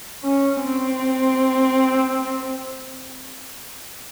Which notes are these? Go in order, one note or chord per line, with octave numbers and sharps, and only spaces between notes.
C#4
C4